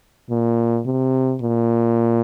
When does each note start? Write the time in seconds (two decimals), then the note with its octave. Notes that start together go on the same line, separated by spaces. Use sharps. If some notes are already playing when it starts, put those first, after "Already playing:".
0.30 A#2
0.86 C3
1.41 A#2